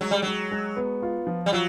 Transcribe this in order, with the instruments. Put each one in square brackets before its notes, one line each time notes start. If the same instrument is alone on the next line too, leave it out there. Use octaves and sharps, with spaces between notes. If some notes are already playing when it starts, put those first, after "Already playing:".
[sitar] F#3 [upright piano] G#3
[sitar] G3
[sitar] F#3 [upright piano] G#3
[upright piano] G#3
B3
F4
F3
[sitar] G3
[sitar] F#3 [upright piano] F4